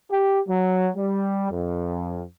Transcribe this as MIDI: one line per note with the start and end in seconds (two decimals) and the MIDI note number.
0.10 0.40 67
0.48 0.88 54
0.97 1.50 55
1.51 2.23 41